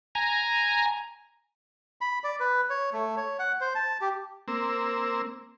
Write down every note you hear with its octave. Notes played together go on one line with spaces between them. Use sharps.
G#5 A#5
B5
D5
B4
C#5
A3
C#5
F#5
C5
A5
G4
A#3 C4 E6